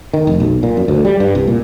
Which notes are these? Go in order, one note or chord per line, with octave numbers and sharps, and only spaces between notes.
D#3
F1
B1
A#2
F#2
D2
G3
G2
C2
A#2